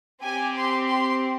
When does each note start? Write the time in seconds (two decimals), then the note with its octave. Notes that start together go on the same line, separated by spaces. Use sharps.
0.22 C4 G4 G#5
0.55 C6
0.88 C6